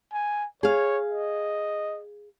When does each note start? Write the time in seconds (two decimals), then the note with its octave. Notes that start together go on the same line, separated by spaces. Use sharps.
0.13 G#5
0.63 G#4 C#5 F5
1.12 D#5